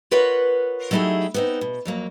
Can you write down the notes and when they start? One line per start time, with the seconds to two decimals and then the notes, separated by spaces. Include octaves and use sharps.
0.11 F4 A#4 B4 C#5 D#5 F#5
0.91 F#3 A3 D#4 E4 G4 G#4
1.34 B3 C4 D#4
1.61 B2
1.85 F2 F#3 A#3